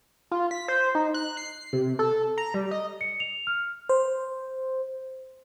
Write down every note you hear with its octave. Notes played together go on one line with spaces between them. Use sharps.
F4
B6
C5
D#4
F#6
C7
C3
A4
A#5
G3
D#5
C#7
F7
F6
C5